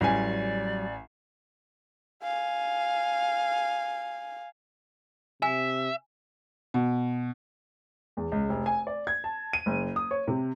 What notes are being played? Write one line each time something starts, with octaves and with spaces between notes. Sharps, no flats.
A1 F#3 G3 D5 G#5
F5 G#5
C3 E5 G#5
B2
E2
C#2
F1
G#5
D5
G#6
A5
D#7
F#1
D#6
C#5
C3